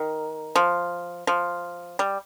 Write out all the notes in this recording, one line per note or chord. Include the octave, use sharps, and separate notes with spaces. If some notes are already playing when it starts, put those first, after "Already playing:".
Already playing: D#3
F3
F3
G3